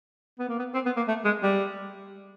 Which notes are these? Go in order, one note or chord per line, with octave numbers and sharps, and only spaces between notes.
B3
A#3
B3
C4
B3
A#3
A3
G#3
G3